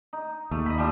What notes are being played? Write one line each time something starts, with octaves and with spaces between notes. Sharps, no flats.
D#4
D#2 A3
D#5 B5
F3 G3 A3